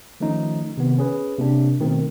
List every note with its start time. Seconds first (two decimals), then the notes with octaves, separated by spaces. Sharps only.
0.20 D#3 F3 A3 C#4 D#4
0.77 C3 D#3 B3
0.98 C#4 G#4 B4
1.38 C3 A#3 D4
1.80 B2 D#3 A3 C4